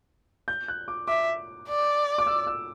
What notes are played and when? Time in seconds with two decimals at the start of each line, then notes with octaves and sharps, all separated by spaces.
0.48 G6
0.68 F#6
0.88 D6
1.08 E5 D6
1.68 D5
2.18 D6
2.26 E6
2.47 E6